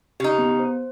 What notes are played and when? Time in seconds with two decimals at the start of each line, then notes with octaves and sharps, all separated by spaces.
0.20 C#3 D#4 G4
0.38 B3
0.59 C5